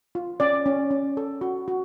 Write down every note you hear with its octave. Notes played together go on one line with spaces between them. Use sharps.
F4
C#4 D5
C#4
C#4
A4
F#4
F#4